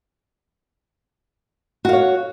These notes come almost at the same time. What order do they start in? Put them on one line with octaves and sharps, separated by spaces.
F#4 F5 C#5